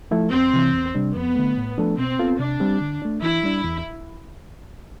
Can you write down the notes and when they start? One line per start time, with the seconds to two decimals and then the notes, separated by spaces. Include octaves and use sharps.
0.11 F3 A3 E4 A4
0.32 F2 C4
0.53 C3 E3
0.74 E2
0.95 C3 G3 D4
1.15 F2 B3
1.36 D3 A3
1.57 A2
1.78 F3 A3 D4 A4
1.98 B2 C4
2.19 B3 F4 A4
2.40 C3 D4
2.60 G3 C4 G4
2.81 D3
3.02 A3 D4
3.22 E3 E4
3.43 G3 D4
3.64 E2